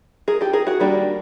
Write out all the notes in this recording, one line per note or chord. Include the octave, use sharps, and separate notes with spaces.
G#4 A#4
G4 A4
G#4 A#4
F#4 G#4
D#3 G3 A#3 D4